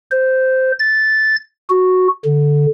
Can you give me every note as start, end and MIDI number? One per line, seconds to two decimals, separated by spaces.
0.11 0.72 72
0.80 1.36 93
1.70 2.08 66
2.25 2.66 50